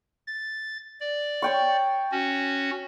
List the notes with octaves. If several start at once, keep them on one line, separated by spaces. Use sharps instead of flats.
A6
D5
C#5 G5 C#6
C#4 F#4